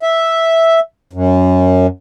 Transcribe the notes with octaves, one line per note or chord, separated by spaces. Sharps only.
E5
F#2